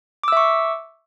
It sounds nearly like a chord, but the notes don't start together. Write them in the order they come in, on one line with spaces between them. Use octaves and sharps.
D6 E6 E5 C#6